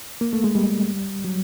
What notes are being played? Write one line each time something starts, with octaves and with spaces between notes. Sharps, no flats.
A#3
A3
G#3
G3
F#3